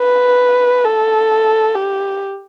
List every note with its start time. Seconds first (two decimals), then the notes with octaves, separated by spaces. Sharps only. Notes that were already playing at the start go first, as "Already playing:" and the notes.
Already playing: B4
0.84 A4
1.75 G4